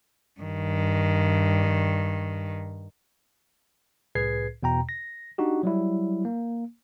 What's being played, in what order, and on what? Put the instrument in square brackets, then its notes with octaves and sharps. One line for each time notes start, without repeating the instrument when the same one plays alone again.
[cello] G2 D#3
[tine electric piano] C2 A2 G#4 B4 G#6 C7
E2 B2 G5 A#5
A#6
D4 D#4 F#4 G4
F#3 G3 E4
A#3